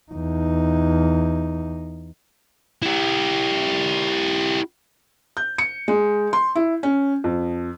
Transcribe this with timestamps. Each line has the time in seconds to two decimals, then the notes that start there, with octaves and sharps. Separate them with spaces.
0.12 E2 D#4
2.82 E4 G4
5.37 G6
5.58 C#7
5.88 G#3
6.33 C6
6.55 E4
6.83 C#4
7.24 F2